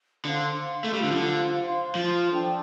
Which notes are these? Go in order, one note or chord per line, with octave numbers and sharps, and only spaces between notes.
D3 C5 F5 C6
A3
G3 F4 C5 F5
D3
F3
D3
C5 F5 C6
F3
D4 A4 C5 G5